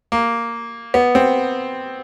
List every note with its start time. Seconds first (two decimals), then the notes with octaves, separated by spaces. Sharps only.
0.12 A#3
0.94 B3
1.15 C4